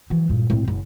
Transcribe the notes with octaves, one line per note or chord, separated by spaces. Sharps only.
E3 F#3
G2 A#2
A2 C4
F#1